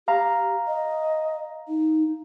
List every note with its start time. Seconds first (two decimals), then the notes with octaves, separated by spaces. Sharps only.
0.08 G4 F5 A#5
0.67 D#5
1.68 D#4